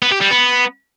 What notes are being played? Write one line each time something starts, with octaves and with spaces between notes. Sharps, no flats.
B3
G4
G3
B3